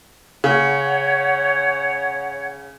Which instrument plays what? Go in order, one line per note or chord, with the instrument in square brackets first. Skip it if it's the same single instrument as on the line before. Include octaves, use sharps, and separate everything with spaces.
[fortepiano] C#3 [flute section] C#5 F#5